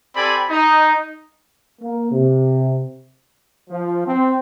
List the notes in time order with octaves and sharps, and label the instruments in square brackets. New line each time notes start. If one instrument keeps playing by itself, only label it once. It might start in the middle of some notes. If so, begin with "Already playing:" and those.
[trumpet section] C4 G4 A4 D5 G#5 B5
D#4
[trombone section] A#3
C3
F3
C4